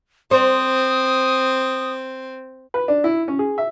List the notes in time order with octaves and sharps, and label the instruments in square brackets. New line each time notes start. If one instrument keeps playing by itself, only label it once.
[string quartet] C4 [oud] C5 [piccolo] D#6
[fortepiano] B4
D4
E4
C#4
G#4
E5